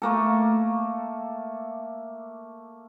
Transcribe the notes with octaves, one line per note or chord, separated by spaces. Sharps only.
A3 A#3 A4